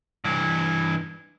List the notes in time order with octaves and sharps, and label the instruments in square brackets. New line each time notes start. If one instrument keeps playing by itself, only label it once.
[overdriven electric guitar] G2 E3